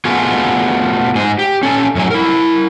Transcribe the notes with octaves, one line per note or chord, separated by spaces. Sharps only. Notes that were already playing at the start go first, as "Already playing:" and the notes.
A3 B3 F4 F#4 G#4
G#2 G#4
G4
C#4 A4 G#5
F#2 A2 F#3 G#5
E4 A#4